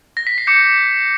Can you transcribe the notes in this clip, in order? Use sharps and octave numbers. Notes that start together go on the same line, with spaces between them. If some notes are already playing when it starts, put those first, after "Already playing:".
A#6
B6
C7
D6 G6 C#7